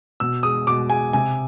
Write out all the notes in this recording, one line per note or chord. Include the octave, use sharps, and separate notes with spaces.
B2 E6
G#3 D#6
B2 D6
G#3 G#5
C3 G#5